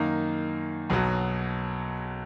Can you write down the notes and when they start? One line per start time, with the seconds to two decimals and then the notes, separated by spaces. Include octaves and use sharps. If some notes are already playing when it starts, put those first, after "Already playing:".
Already playing: F#2 D#3 A#3 D#4
0.90 B1 B2 F#3